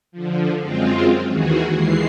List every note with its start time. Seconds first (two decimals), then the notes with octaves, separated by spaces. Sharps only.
0.12 D3 F3
0.60 F#2 G#3 C4 F4
1.27 D#2 D#3 E3 F#4 G#4
1.73 D#2 E3 G#3 C7